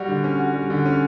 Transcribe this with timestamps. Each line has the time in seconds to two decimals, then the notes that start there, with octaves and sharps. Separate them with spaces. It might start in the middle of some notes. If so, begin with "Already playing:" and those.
Already playing: G3 F#4
0.08 D3
0.24 C#4
0.39 F#4
0.54 G3
0.70 D3
0.85 C#4